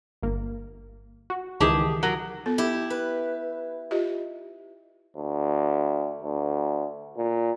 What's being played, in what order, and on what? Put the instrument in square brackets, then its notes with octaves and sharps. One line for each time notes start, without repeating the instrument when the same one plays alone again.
[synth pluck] G1 A#3
F#4
[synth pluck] C#2 D#3 E3 [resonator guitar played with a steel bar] G4 G#4 A5
[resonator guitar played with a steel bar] F#3 A#4
[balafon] B3 A4
[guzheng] E4 G4
B4
[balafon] F4 G4 D#5
[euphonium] D2
D2
A#2